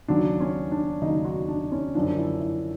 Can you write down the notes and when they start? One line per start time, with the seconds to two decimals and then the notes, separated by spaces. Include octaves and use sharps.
0.08 D#2 C#3 F#3 D4
0.40 C#4
0.72 D4
1.02 D#2 C#3 F#3 D#4
1.25 F#4
1.48 D4
1.72 C#4
1.95 F#2 D3 F3 D4
2.18 E4
2.41 E4